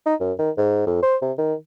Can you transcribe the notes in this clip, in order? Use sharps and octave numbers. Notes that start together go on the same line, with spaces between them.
D#4
F#2
D#3
G#2
F2
C5
C3
D#3